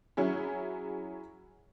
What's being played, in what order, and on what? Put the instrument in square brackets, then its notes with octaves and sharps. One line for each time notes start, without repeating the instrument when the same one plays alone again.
[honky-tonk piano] F#3 C#4 E4 G#4